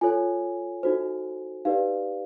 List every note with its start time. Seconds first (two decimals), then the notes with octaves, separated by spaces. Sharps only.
0.01 F4 A4 C#5 G#5
0.83 D#4 F#4 A4 C5
1.65 D#4 G4 B4 D5 F5